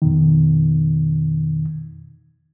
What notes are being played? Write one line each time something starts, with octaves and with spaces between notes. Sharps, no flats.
F2 B2 D#3